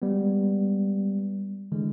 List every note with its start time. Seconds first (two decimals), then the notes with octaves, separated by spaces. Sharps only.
0.02 G3 G#3 B3
1.72 D3 E3 G#3